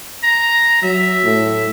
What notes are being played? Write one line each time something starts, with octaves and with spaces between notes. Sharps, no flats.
A#5
F#3 E5
A2